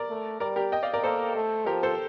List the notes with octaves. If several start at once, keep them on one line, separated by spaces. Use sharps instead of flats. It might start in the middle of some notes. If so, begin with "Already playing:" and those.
Already playing: A#4 D5
A3
G3 A#4 D5
G4 A#4
D#5 G5
D5 F5
A#4 D5
A#3 A4 C5
A3
F3 G4 A#4
A4 C5